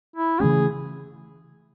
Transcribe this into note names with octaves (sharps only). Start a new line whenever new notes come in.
E4
C#3 E3 A3 C#4 G#4